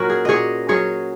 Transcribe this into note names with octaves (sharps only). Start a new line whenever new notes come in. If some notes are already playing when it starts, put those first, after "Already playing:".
Already playing: A#2 F#3 C#4 F#4 A#4
G#4
A#2 G#4 C#5 D#5
F#3 C#4 G#4 C#5